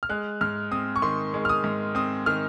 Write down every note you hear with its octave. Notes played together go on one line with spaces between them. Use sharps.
F6
G#3 F#6
G#2 F6
C4 D#6
C#6
D#3 C6
G#3
F6
D#6
G#2
C4 D#6
D#3 F6